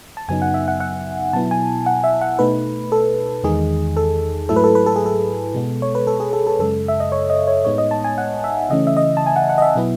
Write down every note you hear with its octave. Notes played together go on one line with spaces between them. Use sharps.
A5
F#2 C#3 F#3 B3 D#4 G#5
F#5
E5
F#5
F#5
B2 F#3 B3 E4 A5
G#5
F#5
E5
F#5
B2 A3 D#4 B4
A4
E2 D#3 G#3 D#4 G#4
A4
G#2 F#3 A3 E4 A4
B4
A4
B4
A4
G#4
A4
B2 G#3 B3
C#5
B4
A4
G#4
A4
A4
F#2 C#3 G#3 A4
E5
D#5
C#5
D#5
C#5
A2 G#3 B3 D#4 C#5
D#5
A5
G#5
F#5
E5
C#3 E3 A3 C#4 D#5
E5
D#5
A5
G#5
F#5
F#5
D#5
E5
B2 F#3 B3 E4